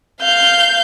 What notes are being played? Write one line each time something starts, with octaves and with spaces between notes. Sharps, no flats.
F5 G6